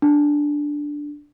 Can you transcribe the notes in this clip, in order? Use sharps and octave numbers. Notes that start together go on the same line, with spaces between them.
D4